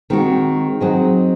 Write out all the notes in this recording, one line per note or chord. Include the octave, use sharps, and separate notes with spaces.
D#3 G#3 C4 F#4
F#3 C4 D#4 G#4 D#5